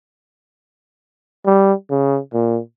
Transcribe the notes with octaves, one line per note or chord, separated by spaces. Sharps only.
G3
C#3
A#2